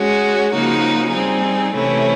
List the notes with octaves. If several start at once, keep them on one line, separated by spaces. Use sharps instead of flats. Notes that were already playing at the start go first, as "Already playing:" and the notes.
Already playing: G#3 C#4 F#4
C#3 F3 A#3 D#4 F#4
G3 C4 D#4 G#4
C3 E3 A3 C#4 E4